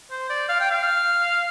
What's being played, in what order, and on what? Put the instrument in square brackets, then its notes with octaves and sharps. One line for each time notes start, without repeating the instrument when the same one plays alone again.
[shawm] C5
D5
F5
G5
F5